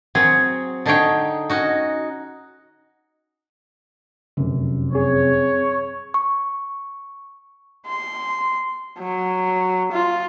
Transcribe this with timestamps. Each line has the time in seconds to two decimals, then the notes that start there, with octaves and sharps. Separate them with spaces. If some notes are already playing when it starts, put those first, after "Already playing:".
0.15 F#3 C4 G#4 C#5
0.86 D3 D#4 G#4 C#5 G5
1.50 C#4 D#4 F#4
4.37 F1 F#2
4.92 C4 G#4 C#5
6.14 C#6
7.87 C6
8.99 F#3
9.92 F4